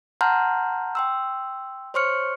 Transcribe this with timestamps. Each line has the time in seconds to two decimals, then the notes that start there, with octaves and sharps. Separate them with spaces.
0.21 F#5 A5 A#5 C6 F6 G6
0.95 G5 C6 E6
1.94 C5 C#5 C6 C#6 F6 C#7